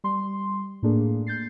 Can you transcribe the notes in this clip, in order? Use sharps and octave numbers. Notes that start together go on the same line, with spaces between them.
G3 C6
A2 A3 A#3 D4 G#4
G6 A6 C7